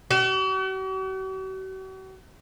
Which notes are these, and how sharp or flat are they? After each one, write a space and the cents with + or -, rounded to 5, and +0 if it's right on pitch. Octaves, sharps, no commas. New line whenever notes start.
F#4 +45